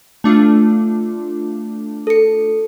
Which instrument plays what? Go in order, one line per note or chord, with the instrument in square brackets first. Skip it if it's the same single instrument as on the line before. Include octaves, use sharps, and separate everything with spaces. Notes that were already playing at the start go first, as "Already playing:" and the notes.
[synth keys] A3 D4 F4
[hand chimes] A4 C#7